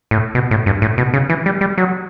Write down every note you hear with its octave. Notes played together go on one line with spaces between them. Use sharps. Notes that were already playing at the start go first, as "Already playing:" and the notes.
A2
B2
A2
G2
A2
B2
C#3
E3
G3
G3
F#3